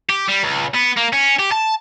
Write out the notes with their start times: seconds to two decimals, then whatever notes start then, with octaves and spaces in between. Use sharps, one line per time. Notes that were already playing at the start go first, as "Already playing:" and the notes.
0.10 G4
0.28 G3
0.44 C#2
0.74 B3
0.97 A#3
1.13 C#4
1.39 G4
1.51 A5